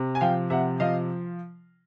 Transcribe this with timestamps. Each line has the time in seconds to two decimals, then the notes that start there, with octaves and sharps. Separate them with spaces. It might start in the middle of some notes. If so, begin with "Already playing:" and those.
Already playing: C3
0.15 G#5
0.21 F3 F5 G5
0.50 C3 E5 F#5
0.80 F3 D#5 F5